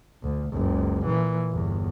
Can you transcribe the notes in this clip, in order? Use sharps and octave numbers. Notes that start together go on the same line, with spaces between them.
D2
F#1 C#2
A#2 E3
G1 E2